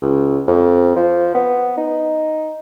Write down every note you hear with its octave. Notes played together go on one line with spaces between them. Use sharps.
C#2
F2
F3
B3
D#4